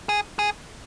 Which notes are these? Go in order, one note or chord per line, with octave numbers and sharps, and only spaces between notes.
G#4
G#4